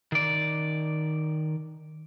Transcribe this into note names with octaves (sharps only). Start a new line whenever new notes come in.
D#3 D5